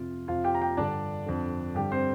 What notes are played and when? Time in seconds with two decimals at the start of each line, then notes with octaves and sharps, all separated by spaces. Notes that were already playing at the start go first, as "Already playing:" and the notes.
Already playing: F2 C3 F4
0.28 F2 C3 F4 F5
0.44 G4 G5
0.55 A#5
0.61 G4 G5
0.77 G2 D3 D4 D5
1.26 F2 D3
1.75 G2 D3 G4
1.91 C4 C5